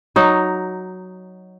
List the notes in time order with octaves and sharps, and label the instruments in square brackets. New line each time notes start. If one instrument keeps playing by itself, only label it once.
[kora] F#3 D#4